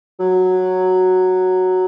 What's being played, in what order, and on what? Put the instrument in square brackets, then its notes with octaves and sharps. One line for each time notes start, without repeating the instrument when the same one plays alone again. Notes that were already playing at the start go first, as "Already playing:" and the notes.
[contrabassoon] F#3